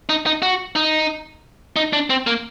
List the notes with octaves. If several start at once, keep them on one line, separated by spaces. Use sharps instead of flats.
D#4
D#4
F#4
D#4
D#4
D4
C4
A#3